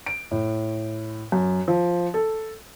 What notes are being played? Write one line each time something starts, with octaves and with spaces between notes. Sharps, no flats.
D7
A2
F#2
F3
A4